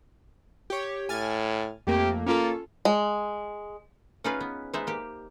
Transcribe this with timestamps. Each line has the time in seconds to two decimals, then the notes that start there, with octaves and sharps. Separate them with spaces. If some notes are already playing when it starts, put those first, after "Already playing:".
0.70 G4 C#5
1.09 A2 G#5 F6 A6
1.87 F2 A3 A#3 G4
2.26 A#3 C#4 F4 A4
2.85 G#3
4.24 C#4 D#4 F4 G#4 B4 F5
4.40 B3
4.73 G#3 B3 D#4 C5 E5
4.87 A#3 G4